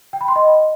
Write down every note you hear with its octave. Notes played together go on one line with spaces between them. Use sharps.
G5
B5
C6
D#5